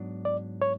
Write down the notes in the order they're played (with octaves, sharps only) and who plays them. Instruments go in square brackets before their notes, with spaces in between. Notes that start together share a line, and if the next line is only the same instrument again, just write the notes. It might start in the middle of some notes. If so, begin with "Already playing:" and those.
Already playing: [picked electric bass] G#2 F#3 B3 D4
[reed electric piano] D5
C#5